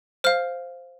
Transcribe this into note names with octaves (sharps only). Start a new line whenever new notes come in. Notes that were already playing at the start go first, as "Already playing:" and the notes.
C5 F5 F6